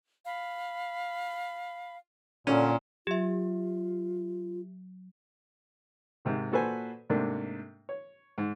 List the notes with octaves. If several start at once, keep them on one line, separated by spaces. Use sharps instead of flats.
F5 B5
A#2 D3 C#4
F#3 F4 G4 E5
G#2 C3 D#3
A#2 F#4 A4 B4 C5 G#5
G#2 C3 A3 A#3 D4
C#5
G#2